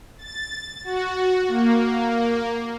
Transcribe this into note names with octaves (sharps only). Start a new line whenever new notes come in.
A6
F#4
A#3